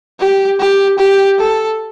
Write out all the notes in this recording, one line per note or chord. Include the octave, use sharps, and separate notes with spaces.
G4
G4
G4
A4